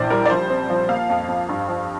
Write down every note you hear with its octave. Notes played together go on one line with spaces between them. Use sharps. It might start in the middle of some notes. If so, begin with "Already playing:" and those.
Already playing: A#1 E3 C5 D5
G3 A#4
D5
F3 C5
C4
F3
A#3 F5
F2
F2
G2
F3